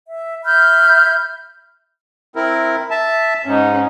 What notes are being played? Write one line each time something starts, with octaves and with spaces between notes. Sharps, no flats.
E5
E5 B5 F6 G6
C4 E4 A#4
E5 A5
G#2 C#4 D#4